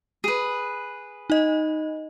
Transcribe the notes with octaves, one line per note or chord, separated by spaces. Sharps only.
G#4 B4
D#4 D#5